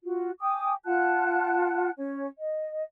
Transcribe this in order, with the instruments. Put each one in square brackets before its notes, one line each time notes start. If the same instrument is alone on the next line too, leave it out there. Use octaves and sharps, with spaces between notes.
[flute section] F4 F#4
G5 G#5 D6 D#6
F4 F#5 A5 F#6
C#4 C#5
D#5